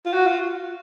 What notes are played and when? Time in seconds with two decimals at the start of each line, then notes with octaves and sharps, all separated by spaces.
0.06 F4
0.13 F#4
0.27 F4